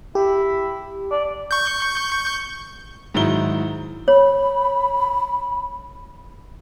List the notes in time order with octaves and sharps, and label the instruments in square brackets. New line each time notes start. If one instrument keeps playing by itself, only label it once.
[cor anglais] E4 [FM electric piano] G4
[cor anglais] D5
[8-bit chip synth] C#6 G6
[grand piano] G#2 D#3 F#3 E4 G7
[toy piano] C#5 [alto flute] B5